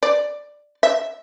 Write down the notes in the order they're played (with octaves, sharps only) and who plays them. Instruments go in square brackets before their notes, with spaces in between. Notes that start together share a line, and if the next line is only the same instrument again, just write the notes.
[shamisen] D5
E5